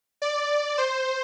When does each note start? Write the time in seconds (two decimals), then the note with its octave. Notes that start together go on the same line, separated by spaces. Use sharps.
0.22 D5
0.78 C5